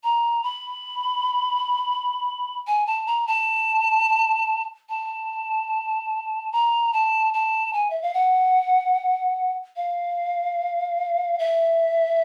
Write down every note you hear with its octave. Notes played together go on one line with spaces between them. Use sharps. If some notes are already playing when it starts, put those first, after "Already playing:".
A#5
B5
G#5
A5
A#5
A5
A5
A#5
A5
A5
G#5
E5
F5
F#5
F5
E5